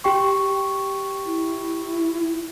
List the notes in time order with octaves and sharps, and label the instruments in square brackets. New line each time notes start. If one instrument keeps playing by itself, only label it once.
[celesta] G4 G5 C#6
[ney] E4